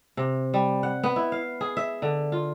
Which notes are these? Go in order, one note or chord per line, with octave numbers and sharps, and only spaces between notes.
C3
G3
F#5
B3
E4
F5
G#4
E5
D3
F4